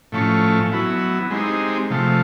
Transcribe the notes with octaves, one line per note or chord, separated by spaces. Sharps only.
A2 F3 A3 C#4
F#3 B3 E4
G#3 C4 D#4 G4
C3 F3 A3